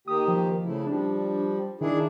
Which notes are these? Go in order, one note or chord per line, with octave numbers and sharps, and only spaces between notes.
D#3 A#3 G4 D#6
F3
C#3 A3 E4
F3 G3 D4
D#3 D4 E4 G#4